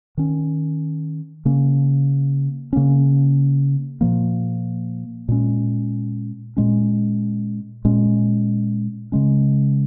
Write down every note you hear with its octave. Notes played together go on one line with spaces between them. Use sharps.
D#3 C#4
C#3 A#3 C#4
C#3 A#3 C#4
A#2 F3 A#3
A#2 G#3 C#4
A#2 G#3 C#4
A#2 G#3 C#4
C#3 G#3 C#4